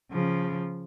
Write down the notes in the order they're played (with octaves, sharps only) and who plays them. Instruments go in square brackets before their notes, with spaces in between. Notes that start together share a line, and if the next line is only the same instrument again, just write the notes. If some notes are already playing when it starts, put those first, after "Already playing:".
[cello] C#3 F3